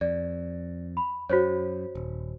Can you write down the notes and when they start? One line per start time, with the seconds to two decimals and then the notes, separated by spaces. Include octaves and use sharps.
0.01 F2 D5
0.97 B5
1.30 F#2 F#4 C5 C#5
1.95 D#1